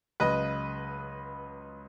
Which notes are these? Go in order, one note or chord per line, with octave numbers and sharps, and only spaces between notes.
C#2 C#3 F#3 B4 D#5